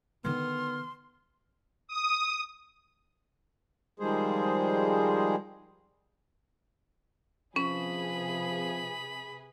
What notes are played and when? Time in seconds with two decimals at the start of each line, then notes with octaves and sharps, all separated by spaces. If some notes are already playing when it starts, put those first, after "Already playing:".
0.25 D3 D#3 B3 C6 F6
1.88 D#6
4.00 D#3 F3 G3 G#3 G#4 C5
7.56 C3 F3 C#4 G#4 B4 B5